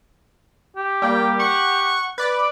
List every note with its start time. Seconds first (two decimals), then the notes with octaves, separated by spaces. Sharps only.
0.77 G4
1.02 G3 A#3 G5
1.40 F#5 C#6
2.18 B4 D5 D6